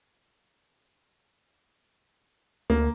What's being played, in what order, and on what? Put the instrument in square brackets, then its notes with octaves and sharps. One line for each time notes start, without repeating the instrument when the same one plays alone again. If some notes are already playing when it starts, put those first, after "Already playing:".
[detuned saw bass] D2 [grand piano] A#3